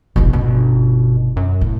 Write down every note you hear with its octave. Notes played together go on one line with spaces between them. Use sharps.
E1 A1 B2
G1 B2 C#4
F#2
A2